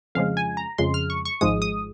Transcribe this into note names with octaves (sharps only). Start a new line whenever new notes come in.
F2 C#3 F3 G#3 F5
G#5
A#5
F2 C#3 F3 G#3 C6
F6
C#6
C#6
G#1 G#2 F3 G#3 D#6
D#6